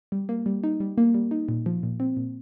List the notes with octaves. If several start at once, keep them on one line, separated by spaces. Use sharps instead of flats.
G3
A#3
G3
D#4
G3
A#3
G3
D#4
A#2
F3
A#2
C4
A#2